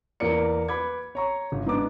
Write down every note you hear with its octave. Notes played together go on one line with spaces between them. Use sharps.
E2 A#3 A#4 D5 C#7
B4 B5 D6 G#6
C#5 A#5 C#6
G1
G#2 B3 D4 D6